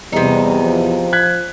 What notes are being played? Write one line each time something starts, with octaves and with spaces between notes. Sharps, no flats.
E2 C3 G3 D#4
F3
F#6 G#6 B6